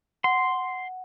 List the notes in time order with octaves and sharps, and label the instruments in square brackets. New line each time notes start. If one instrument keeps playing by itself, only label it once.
[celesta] F#5 [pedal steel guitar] C6